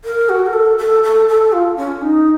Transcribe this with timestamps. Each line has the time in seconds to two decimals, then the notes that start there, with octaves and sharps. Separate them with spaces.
0.05 A#4
0.29 F#4
0.46 A#4
0.53 A4
0.78 A4
1.03 A4
1.28 A4
1.53 F4
1.77 C#4
2.02 D#4